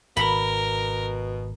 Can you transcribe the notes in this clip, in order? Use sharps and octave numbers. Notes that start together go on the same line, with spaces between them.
G#1 B2 A#4 B5